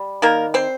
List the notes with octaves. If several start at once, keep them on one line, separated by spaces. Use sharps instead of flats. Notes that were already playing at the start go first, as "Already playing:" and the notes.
Already playing: G3
D#3 A#3 A#4
C4 C5